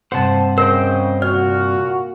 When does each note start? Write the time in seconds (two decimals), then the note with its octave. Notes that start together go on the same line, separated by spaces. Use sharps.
0.12 G2 C3 C5 F#5 A5
0.58 C#3 A#4 C5 D#5 G5
1.22 A#2 F#4 D5 F6